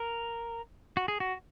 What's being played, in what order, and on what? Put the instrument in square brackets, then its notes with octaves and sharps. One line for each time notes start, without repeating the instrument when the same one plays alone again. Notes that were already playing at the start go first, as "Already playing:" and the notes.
Already playing: [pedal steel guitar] A#4
F#4
G#4
F#4